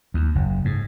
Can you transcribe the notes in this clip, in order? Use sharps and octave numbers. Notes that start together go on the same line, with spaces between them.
D#2
F#1
G#2